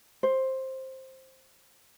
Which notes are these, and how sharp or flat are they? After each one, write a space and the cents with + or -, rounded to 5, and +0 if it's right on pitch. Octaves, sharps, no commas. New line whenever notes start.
C5 +10